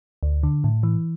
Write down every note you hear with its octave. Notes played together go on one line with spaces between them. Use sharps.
D2
D3
A2
E3